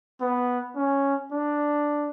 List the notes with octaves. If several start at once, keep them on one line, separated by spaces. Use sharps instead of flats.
B3
C#4
D4